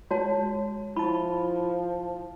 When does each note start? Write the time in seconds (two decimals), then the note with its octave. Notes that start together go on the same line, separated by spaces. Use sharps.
0.11 G#3 F#4 C#5 A5
0.96 F3 E4 A5 B5